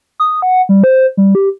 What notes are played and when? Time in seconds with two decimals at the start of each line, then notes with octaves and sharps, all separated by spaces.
0.20 D#6
0.42 F#5
0.69 G3
0.84 C5
1.17 G3
1.35 G4